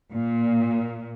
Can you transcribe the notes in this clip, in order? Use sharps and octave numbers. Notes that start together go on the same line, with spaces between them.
A#2